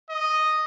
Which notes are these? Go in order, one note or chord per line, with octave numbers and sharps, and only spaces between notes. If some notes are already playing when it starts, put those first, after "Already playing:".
D#5